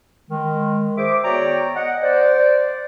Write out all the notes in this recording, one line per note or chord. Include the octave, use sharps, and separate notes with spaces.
D#3 G#3
G#4 C5 E5 D6
B3 F#4 C#5 D5 G5 A#5
D#5 F#5
C5 D5